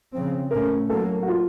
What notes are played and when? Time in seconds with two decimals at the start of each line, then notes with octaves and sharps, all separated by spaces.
0.13 C#3 F3 C4
0.51 A2 A3 C#4 A#4
0.89 A2 F#3 A#3 A4
1.23 F#4
1.28 F4